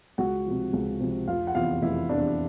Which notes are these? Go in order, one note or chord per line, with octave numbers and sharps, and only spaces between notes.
C#2 F#4 F#5
C3 F3
C#2
C3 F3
F1 F4 F5
F#5
E2 C3 E3 F4 F5
F1 E4 E5
E2 C3 E3 D4 D5